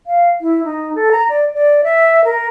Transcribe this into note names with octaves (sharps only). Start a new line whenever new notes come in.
F5
E4
D#4
A4
A#5
D5
D5
E5
A#4